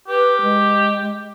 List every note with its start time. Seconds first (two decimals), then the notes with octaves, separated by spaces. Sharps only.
0.08 G4 B4
0.42 G#3